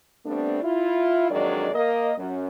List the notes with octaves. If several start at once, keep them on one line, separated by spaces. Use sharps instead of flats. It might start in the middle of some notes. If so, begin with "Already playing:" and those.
G3 A3 B3 C4 D4
E4 F4
F2 D#3 F#3 G#3 D4 D5
A#3 A#4 D#5
F#2